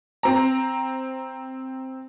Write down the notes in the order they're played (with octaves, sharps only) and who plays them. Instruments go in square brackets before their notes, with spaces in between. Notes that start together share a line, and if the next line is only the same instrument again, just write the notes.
[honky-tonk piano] C4 A#5